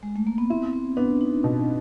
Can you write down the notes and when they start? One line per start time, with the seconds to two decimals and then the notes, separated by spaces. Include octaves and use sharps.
0.03 G#3
0.16 A3
0.27 A#3
0.38 B3
0.50 C4 E4
0.73 C4
0.97 B3 D4
1.21 D#4
1.44 B2